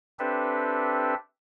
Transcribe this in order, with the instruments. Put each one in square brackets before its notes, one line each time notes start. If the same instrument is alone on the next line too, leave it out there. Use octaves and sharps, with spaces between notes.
[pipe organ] C4 D4 G4 A4 B4 E5